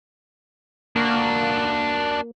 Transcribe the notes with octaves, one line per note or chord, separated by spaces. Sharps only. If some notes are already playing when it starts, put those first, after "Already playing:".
A#3 D4 F#4